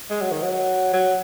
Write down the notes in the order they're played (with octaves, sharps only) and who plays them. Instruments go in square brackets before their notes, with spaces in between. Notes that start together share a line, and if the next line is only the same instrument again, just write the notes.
[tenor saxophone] G#3
F#3
D#3
F#3
F#3